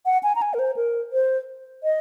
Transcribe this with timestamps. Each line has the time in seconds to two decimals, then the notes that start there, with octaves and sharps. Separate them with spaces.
0.06 F#5
0.23 G#5
0.35 A#5
0.42 G#5
0.54 A#4
0.59 C5
0.76 A#4
1.13 C5
1.84 D#5